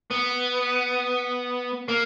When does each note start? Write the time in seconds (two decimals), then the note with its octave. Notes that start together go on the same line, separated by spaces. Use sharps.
0.11 B3
1.88 A#3